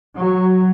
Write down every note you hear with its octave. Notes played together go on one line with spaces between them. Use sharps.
F#3